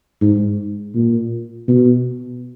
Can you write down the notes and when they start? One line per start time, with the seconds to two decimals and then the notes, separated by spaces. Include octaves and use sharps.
0.21 G#2
0.94 A#2
1.68 B2